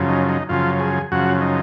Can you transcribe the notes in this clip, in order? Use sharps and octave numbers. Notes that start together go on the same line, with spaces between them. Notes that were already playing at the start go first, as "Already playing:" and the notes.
Already playing: F#2 C#3 F3
D#4
D#4
F#2 C#3 F3 F4
G#4
F#2 C#3 F3 F#4
D#4